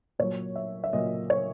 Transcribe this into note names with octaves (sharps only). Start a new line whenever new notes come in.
A#2 F#3 C#5
E5
E5
A#2 F#3 D#5
C#5